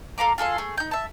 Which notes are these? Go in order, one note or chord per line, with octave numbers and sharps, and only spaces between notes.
A4 F5 A#5 D6
F4 G#4 A4 F5
A3 G#4
D#4 G6
E5 A5